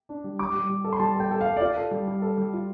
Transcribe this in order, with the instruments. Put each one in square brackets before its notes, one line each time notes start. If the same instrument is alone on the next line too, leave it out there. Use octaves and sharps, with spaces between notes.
[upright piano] D4
G3
[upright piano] G3 [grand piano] D6
[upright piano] G3
G3
A4
[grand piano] C6
[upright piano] G3 [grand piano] A5
[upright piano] A4 [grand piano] G5
[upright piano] A4
[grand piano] F5
[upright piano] A4
[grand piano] D5
[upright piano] F4 [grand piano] F5
[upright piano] A4
G3
G3
A4
G3
F4